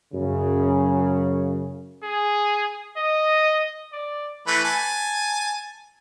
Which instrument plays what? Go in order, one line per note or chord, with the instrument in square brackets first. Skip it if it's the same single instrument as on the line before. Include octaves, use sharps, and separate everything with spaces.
[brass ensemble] F#2 C#3
[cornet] G#4
D#5
D5
[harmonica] E3 A3 B4
G#5 A5